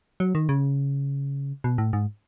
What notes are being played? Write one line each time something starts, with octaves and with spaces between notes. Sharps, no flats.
F#3
D#3
C#3
B2
A2
G#2